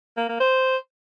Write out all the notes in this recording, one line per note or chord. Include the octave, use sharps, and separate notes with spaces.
A#3
A#3
C5